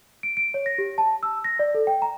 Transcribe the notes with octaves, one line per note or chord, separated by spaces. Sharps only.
D7
D7
C#5
A#6
G4
A5
E6
A#6
D5
A4
G5
A#5